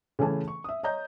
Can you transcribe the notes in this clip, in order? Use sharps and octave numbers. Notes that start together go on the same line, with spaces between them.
C#3 E3 A3 G#4 A5
C#6
E5 D#6
C#5 D#5 A#5 G6